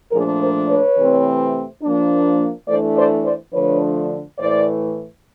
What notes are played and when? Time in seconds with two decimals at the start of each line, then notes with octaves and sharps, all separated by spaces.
0.11 A#2 F3 A3 D4 G#4 A#4
0.40 A#4 C5
0.68 B4 C#5
0.97 C3 E3 A3 C4
1.82 F3 A#3 D4
2.67 E3 A3 D4 C5 D5
2.97 C5 D5
3.24 C5 D5
3.52 D3 F3 A3 D4 B4 C#5
4.38 A2 E3 A3 C5 D5